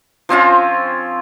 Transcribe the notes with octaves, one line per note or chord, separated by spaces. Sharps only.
F3 C4 C#4 F4